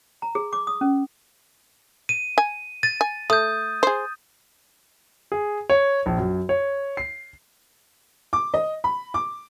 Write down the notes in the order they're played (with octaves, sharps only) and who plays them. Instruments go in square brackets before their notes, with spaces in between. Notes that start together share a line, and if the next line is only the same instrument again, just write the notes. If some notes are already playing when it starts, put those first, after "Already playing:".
[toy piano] A#5
G#4
D6
D#6
C#4
[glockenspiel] D#7
[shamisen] G#5
[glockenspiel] A6 D#7
[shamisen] G#5
[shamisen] A3 [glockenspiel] D#6 G6
[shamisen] G#4 C5
[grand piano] G#4
C#5
A#1
F#2
C#5
C7
[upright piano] D6
D#5
B5
D6